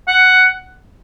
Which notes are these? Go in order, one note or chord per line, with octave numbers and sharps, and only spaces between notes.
F#5